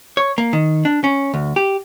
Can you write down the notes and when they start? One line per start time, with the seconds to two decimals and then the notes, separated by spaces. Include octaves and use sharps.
0.17 C#5
0.38 A#3
0.53 D#3
0.85 D4
1.04 C#4
1.34 D2
1.56 G4